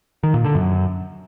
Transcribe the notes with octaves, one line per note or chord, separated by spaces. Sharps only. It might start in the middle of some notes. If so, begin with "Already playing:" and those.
D#3
A#2
D3
F#2